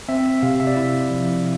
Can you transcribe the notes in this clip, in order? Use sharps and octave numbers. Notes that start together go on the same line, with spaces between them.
C4 E5
E5
C3 F5
E5
D5
E4 E5
F3